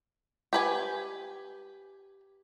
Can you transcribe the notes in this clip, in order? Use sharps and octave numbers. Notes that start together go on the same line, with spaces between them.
G4 B4 G#5